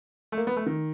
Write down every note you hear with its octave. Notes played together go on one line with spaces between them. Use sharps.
A3
A#3
B3
A3
D#3